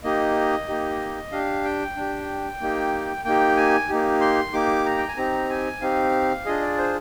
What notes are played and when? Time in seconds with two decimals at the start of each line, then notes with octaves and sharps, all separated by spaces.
0.04 A#3 D#4 G4 D#5
0.68 A#3 D#4 G4
1.32 D4 G4 F5
1.64 G5
1.97 D4 G4
2.61 A#3 D#4 G4
3.25 A#3 D#4 G4 G5
3.57 G#5
3.89 A#3 D#4 G4
4.21 C6
4.53 A#3 D#4 G4 D6
4.86 A#5
4.98 G5
5.08 G#5
5.17 C4 D#4 G4 A#5
5.50 G#5
5.81 C4 D#4 G4 F5
6.45 D4 F4 G#4 D#5
6.61 D5
6.78 C5